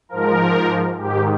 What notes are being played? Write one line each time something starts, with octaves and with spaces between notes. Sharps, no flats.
G#2 F3 A#4
G#2 D#3 G4